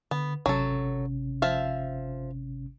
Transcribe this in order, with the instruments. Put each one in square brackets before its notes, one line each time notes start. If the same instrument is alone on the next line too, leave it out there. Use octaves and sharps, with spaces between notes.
[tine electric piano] D3 [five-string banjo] B3
[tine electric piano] G#1 C3 C#4 [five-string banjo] F#3 A4
[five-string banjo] F3 E5 F5